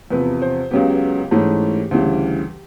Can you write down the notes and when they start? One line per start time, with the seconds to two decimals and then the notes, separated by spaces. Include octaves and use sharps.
0.10 E2 C3 F3 B4
0.42 C5
0.71 C#2 C#3 F#3 B3 G4
1.31 G#2 E3 A3 C#4
1.91 D2 C#3 E3 G3